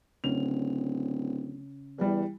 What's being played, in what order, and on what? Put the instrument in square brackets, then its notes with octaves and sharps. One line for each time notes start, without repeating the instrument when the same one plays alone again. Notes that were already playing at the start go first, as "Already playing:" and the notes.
[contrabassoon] D1 [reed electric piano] C#3 C#4 [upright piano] F7
[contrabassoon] E2 [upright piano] E3 G3